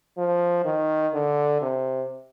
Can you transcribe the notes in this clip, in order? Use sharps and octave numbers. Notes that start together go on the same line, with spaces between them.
F3
D#3
D3
C3